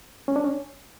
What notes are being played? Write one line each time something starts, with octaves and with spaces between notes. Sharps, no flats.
C#4
D4
C#4